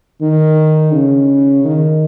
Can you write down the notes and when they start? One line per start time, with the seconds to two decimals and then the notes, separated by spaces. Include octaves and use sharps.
0.21 D#3
0.92 C#3
1.64 D#3